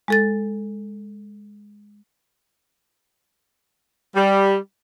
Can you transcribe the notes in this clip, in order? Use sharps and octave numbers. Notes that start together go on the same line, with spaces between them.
G#3 A4 A6
G3